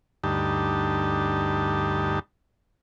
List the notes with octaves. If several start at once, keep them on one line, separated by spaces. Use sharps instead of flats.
D2 G2 D#4 G4 A5